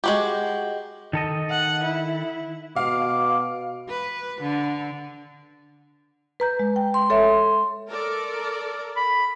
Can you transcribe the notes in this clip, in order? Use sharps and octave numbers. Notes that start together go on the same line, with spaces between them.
G#3 F#4 G4
D#3 A4 D#5
F#5
E4
B2 F5 D6
B4
D3
B4 A#5 G6
G#3
G5
C6
A4 C#5 E5
A4 A#4 D5
B5